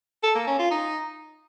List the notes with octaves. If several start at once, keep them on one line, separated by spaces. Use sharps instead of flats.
A4
A#3
C#4
F4
D#4